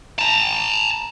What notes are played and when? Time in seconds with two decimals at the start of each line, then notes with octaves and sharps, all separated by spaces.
0.19 A5 A#5